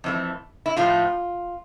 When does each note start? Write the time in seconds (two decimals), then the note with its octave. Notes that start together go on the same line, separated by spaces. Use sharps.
0.04 F2 E3 A3
0.66 E4
0.76 A2 F3 A3 F4